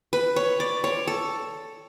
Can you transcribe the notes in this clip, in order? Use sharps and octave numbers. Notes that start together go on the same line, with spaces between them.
B4
C#5
D5
C#5
A4